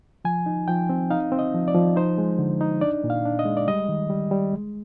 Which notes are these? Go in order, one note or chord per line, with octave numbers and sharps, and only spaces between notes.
F3 G#5
D#4
F3 G5
C4
D#4 F5
C4
D#5
F3
D5
F3
D#4 C5
G#3
D3
D#4
D4 D5
A#2
F5
D4
D#5
G#3
D5
G3 D#5
D#3
G3
G3
G#3